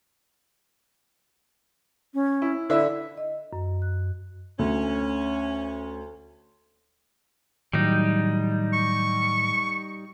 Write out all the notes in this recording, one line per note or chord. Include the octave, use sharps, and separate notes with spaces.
C#4
E4
D3 D4 E4 E5
D#5
F#2
F#6
D2 C#4
A2 D#3 F#3 G3 D#4
C#6